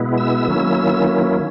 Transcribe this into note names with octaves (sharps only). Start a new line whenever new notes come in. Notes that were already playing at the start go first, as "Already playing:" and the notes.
Already playing: B2 G#3 B3 E4
E6
D#3 F#3 A#3 C#4 E4